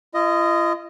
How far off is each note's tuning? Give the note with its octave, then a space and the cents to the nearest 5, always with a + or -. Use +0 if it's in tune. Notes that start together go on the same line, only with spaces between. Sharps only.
F4 -45 D#5 +0